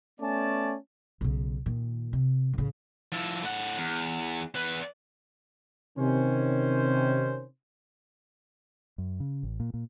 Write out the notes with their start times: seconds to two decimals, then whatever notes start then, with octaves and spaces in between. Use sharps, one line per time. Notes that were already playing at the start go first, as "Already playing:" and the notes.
0.20 A3 B3 C#4 D5 G#5 A5
1.21 B1 C#3
1.66 A#2 D#3
2.13 C3
2.54 A1 C#3
3.12 F3 E4
3.42 A2 F#5
3.78 E2
4.55 E2 B4
5.98 C3 D#3 C#4 C5
8.98 F#2
9.20 C#3
9.43 A1
9.60 A#2
9.74 A#2